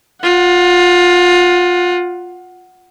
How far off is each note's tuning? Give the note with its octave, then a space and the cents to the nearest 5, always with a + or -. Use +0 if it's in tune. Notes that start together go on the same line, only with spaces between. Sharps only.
F4 +20 F#5 +0